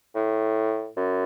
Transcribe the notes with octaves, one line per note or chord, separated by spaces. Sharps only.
A2
F#2